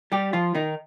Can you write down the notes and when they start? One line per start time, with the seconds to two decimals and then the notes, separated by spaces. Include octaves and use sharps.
0.12 G3 G4
0.33 F3 F4
0.55 D#3 D#4